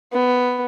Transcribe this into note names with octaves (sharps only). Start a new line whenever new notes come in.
B3